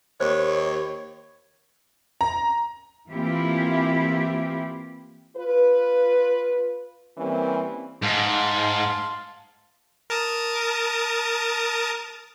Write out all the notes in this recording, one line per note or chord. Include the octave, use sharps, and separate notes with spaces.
D#2 C5 C#5
A#5
E3 A#3 C4 E4 F4 G4
F4 B4
E3 G3 A#3 C4 C#4
G#2 F5 A5 C6
A#4 A5 D#6